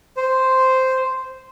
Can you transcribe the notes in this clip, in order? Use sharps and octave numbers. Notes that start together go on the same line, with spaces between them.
C5